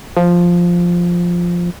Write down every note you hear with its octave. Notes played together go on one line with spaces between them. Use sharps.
F3